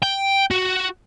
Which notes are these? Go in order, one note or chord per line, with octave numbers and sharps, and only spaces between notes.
G5
F#4